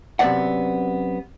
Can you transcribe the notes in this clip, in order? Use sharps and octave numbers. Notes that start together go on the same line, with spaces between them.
F#2 C3 F3 B3 D5 F#5